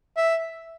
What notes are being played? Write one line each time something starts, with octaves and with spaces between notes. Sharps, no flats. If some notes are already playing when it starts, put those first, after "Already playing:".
E5